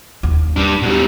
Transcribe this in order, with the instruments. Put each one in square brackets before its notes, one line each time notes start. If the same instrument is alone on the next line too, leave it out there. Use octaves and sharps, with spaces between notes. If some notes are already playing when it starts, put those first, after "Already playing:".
[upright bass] D#2
[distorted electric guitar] G3 D4
B2 G3